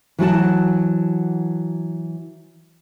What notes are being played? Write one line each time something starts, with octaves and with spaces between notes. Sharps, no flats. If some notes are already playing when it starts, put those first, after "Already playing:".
E3 F#3 F#4 A5